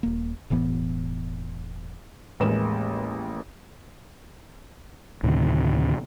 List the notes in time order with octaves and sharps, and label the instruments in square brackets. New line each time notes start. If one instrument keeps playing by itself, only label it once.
[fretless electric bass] D#1 A#3
E1 A2 E3 B3
[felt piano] A1 D#2 G#3 A#3 B4 E7
[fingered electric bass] D2 A2 C3 D#3